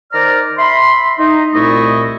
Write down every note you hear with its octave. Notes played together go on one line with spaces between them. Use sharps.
D#3 C5 D5 A#5 F6
E5 B5 C6
D#4
C2 A#2 A3 E4 D#5 C#6